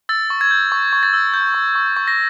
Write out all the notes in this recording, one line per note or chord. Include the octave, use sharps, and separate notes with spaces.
E6 A6
C#6
G#6
G6
C#6
C#6
A6
E6
G6
C#6
C#6
C#6
A#6